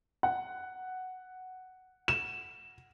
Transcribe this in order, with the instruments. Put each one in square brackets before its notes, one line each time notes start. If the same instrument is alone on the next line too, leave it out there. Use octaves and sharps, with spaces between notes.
[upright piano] F#5
[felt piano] E7